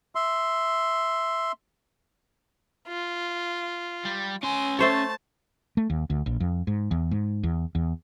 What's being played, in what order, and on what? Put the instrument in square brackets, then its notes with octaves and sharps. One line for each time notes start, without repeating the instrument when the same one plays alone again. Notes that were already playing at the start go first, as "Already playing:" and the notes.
[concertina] E5 C6
[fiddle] F4
[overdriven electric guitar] G3
[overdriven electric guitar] C#4 C6 [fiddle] G#5
[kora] A3 C5 C#5 [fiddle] A5
[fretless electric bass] A3
D#2
D2
A#1
F2
G#2
E2
G#2
E2
E2